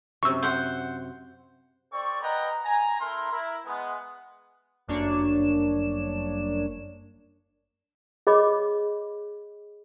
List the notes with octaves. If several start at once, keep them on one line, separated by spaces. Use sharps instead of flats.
F#2 C3 C#6 E6
C5 F#5
C4 A4 D5 C#6
A#4 B4 D#5 F#5 G5 A#5
G#5 A#5
A3 E4 A#4 C6
E4 A#4
G#3 B3
G1 F#2 A#3 D4 C#5 E7
G#4 C#5 D#5 B5 D6